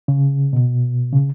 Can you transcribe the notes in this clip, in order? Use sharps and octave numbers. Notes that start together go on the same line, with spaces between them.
C#3
B2
C#3